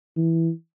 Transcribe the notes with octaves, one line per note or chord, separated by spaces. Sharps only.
E3